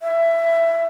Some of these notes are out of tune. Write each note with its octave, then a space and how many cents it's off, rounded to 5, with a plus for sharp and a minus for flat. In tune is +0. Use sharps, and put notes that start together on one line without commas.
E5 +15